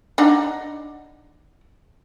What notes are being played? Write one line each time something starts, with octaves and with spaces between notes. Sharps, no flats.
D4 D#4 F#5